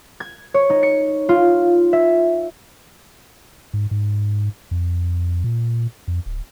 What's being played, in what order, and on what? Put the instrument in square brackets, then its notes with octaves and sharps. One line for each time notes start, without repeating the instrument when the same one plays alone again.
[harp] G#6
C#5
D#4
C#7
F4
E5
[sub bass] G#2
G#2
F2
A#2
F2
D1